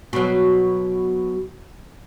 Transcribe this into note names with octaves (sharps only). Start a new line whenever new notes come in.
B2 F#3